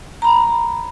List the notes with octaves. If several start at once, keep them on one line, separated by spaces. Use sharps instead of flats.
A#5 B5